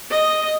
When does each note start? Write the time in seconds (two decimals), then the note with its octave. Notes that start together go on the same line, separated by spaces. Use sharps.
0.11 D#5